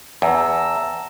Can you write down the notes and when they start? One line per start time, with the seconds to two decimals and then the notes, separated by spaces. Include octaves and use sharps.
0.22 E2 A5 A#5 E6